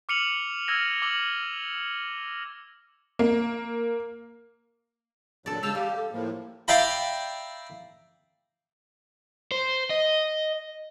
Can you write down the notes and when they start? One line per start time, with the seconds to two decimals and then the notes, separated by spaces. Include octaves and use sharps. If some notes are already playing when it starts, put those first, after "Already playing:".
0.09 D6 F6 C#7 D#7 F7 F#7
0.67 E6 F6 G#6 A#6 D#7 E7
1.02 D6 E6 F#7 G7
3.19 A#3
5.46 A#2 D3 F#3 A4 D5
5.63 C#3 G#3 G4 F5 A5 E6
5.75 G3 G4 F5
5.96 A4
6.12 A2 F3 A#3
6.68 D5 E5 F5 G5 A#5 B5
9.51 C5
9.90 D#5